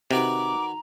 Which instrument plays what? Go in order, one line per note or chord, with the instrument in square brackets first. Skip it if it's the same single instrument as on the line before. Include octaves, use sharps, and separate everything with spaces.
[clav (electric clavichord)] C3 [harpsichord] D#3 F#4 B4 [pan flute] A#5 [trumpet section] D6